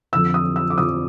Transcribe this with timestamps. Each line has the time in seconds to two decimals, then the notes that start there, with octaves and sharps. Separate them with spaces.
0.12 F2 D3 F3 E6
0.34 D#6
0.56 E6
0.70 D6
0.78 F2 D3 F3 D#6